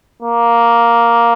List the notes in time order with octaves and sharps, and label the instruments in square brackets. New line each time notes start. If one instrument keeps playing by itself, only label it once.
[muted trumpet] A#3